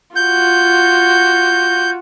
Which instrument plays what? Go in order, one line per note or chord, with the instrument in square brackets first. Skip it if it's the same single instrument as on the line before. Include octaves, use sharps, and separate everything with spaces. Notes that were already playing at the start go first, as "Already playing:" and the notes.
[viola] F4 F#4 [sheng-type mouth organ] G6